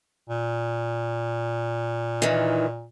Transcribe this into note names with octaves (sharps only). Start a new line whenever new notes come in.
A#2
D#3 E3